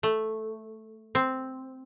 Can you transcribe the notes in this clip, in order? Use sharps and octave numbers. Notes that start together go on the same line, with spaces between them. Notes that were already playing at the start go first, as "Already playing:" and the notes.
A3
C4